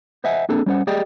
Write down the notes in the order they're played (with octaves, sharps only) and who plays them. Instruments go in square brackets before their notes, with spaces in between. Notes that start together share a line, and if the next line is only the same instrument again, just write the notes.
[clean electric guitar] C5 D#5 E5 F#5 G#5
A#3 C4 D4 G#4 A4
G3 C#4 C5 F#5
G4 G#4 D5 D#5 G5